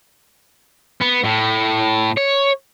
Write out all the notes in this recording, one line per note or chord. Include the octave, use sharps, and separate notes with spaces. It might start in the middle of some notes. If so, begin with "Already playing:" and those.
B3
A2
C#5